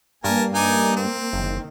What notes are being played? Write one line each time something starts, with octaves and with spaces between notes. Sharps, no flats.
G2 A#3 A#4 G#5 A5
D#4 D5 G#5
C4
F#1 D#3